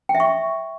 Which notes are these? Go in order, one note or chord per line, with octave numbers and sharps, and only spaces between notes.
G5
E5
C#6